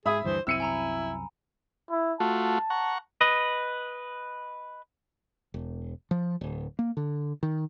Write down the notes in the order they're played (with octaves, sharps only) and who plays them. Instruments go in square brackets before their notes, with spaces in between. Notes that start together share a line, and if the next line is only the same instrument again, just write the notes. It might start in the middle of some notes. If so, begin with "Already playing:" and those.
[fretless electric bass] G#2 [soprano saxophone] G#4 [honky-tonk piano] E5 B5 D#6
[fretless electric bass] D2 G2 E3 [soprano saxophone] C5
[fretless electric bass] C2 F#2 C4 [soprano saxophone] E4 [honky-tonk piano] E6 C#7 D#7
[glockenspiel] G#5 A#5 B5
[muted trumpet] E4
[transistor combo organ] A3 F4 F#4 [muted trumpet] A5
[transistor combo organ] F#5 A#5 C#6
[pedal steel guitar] B4 D#5
[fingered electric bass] E1
F3
D1
A#3
D3
D#3